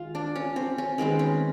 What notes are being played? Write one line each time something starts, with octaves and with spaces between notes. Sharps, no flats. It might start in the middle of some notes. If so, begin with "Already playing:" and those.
Already playing: D#3 G#3 F4
D4
C#4
C4
C#4
D#3 G#3 B3 C4
C#4